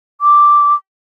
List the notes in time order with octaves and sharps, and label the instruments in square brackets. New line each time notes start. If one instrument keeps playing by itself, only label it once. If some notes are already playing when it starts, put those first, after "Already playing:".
[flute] D6